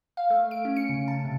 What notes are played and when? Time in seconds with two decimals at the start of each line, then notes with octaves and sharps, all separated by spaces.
0.17 F5
0.30 A3
0.51 D7
0.65 C#4
0.76 C#7
0.89 C#3
1.08 A5
1.25 C3